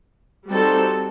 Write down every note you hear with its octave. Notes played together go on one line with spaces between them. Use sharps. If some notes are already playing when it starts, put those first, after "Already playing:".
G3 C4 D#4 F#4 A4